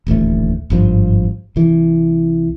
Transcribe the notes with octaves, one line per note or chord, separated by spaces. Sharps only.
D#1 A1 D2 A3
G#1 G2 F3
C2 E3